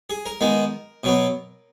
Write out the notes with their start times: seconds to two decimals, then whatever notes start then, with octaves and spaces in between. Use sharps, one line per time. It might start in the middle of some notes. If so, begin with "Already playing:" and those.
0.10 G#4
0.26 A#4
0.41 D#3 G#3 B3
1.04 B2 F#3 B3